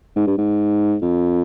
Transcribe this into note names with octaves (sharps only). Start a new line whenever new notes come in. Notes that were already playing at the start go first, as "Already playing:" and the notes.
G#2
G2
G#2
F2